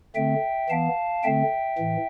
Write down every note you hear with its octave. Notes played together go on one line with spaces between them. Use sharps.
D3 A3 C4 E5 G5
E3 B3 F5 A5
D3 A3 C4 E5 G5
A2 E3